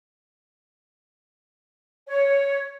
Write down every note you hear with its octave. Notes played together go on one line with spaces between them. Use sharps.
C#5